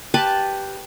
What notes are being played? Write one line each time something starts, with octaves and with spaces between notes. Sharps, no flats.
G4 B4 A5 B5